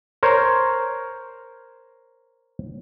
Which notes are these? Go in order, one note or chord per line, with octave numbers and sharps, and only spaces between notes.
A#4 C5 C#5